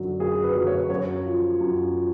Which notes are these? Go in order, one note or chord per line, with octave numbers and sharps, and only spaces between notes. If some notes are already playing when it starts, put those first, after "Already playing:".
Already playing: F#2 D3 F#3
F#2 G#4
B4
D3 F#3
C#5
F#2 C#5
F3
F#2
F3